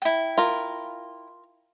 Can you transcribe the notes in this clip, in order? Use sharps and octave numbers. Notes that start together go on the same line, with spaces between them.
E4 G5
F4 A#4